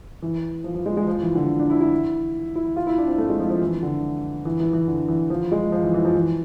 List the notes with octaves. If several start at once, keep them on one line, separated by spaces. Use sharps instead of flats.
E3
F3
F3
G#3
G#3
F3
E3
D3
D4
E4
E4
E4
F4
E4
D4
C4
A3
G#3
F3
F3
E3
D3
E3
E3
E3
D3
E3
F3
G#3
F3
E3
E3
F3
E3